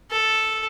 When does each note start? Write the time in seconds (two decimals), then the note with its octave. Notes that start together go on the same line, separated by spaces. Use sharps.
0.11 A4